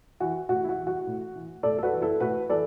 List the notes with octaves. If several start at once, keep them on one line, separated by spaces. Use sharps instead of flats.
E3 F#4
A2 F#4
E4
F#4
E3
F#4
A2
E3
A2 A4 D5
A4
F#4 B4
E3
E4 A4
A2 F#4 B4
E3 A4 D5